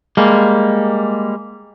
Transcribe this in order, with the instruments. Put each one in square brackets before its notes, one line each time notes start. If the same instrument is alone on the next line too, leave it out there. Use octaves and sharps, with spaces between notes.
[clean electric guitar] G3 G#3 A#3